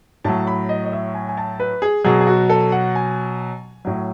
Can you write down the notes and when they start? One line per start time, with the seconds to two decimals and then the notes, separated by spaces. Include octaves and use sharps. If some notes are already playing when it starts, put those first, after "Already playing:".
0.24 A2 F#3 A5
0.47 B5
0.69 D#5
0.85 D#5
0.92 E5
1.14 G#5
1.29 G#5
1.37 A5
1.60 B4
1.82 G#4
2.05 B2 F#3 G#4
2.20 G#4
2.27 F#4
2.49 A4
2.72 F#5
2.95 G#5
3.85 A2 F#3